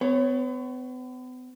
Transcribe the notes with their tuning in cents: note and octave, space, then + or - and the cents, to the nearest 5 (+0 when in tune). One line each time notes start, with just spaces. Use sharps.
B3 +40 C#5 +0